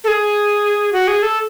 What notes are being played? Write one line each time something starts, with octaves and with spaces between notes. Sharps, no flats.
A4
G#4
F#4
G#4
A4